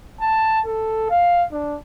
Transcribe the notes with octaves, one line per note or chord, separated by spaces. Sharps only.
A5
A4
F5
D4